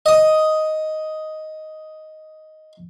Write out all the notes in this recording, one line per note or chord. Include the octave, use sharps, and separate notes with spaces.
D#5 D#6